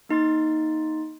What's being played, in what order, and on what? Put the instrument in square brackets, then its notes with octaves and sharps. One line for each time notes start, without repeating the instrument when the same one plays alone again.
[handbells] A#3 D#4 C6 A6